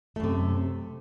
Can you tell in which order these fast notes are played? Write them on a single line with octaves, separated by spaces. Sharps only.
A3 F#2 C3